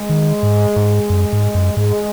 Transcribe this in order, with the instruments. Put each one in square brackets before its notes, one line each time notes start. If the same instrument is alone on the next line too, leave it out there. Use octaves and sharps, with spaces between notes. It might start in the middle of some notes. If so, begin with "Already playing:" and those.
Already playing: [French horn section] G#3
[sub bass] D#3
G#2
G#2
F#2
G#2
F#2
[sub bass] G#2 [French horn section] G#3